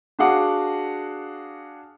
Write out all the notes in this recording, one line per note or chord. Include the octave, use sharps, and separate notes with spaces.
D4 F#4 G#4 F5 F#5 D6